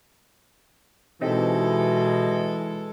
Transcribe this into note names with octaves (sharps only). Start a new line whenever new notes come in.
B2 E3 G#3 C4 D#4 G4 A4